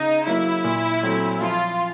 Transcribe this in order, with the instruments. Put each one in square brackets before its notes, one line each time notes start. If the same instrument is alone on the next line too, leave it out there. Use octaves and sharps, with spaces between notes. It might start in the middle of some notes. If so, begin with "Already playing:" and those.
Already playing: [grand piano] C#3 [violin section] D#4
[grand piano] F#3 A#3 [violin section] E4
[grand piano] A#2
F#3 A3 C4
[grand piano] F3 [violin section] F4